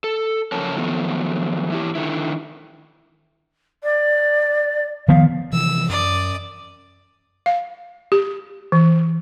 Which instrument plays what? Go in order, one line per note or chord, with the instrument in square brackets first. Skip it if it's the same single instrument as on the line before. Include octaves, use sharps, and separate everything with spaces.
[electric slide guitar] A4
F#2 C#3 F3 A#4 C#5 A5
D#3 F3 F#3 A3 B3
E3 E4 G4
D3 D#3 E4
[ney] D5
[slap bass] D#3 F3 B3 [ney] F5
[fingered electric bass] C3 E3 F3 [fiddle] E6
[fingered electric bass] F#2 [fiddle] D5 D#6
[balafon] F5
G4
E3